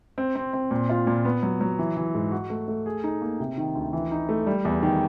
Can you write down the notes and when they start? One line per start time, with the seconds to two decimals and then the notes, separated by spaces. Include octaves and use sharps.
0.18 C4
0.35 C4
0.53 C4
0.71 A#2
0.89 F4
1.07 A#2
1.25 B3
1.43 F#3
1.61 F#3
1.79 E3
1.97 E3
2.14 G#2
2.32 F#4
2.50 A3
2.68 A3
2.86 G#4
3.04 D#4
3.22 A#3
3.40 C3
3.57 D#3
3.75 D2
3.93 E3
4.11 D#4
4.29 A3
4.47 G3
4.65 E2
4.83 D#3